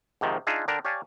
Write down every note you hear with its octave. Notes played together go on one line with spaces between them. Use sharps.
G#2 C3 D#3 F3
D4 D#4 F4 G#4 E5
D3 D4 A#4 G5
G4 C#5 D5 F5 G#5 A5